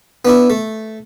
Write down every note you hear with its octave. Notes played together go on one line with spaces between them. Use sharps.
B3 D4 E4
A3